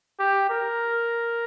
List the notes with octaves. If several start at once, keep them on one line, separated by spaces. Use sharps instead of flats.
G4
A#4